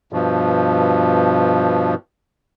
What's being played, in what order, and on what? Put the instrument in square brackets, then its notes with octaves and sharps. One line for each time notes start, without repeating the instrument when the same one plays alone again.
[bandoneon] G2 B2 F3